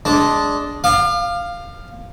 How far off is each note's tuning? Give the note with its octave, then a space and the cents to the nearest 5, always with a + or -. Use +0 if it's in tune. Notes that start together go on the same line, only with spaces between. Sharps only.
G#3 +5 D4 -10
F5 +0 D6 +40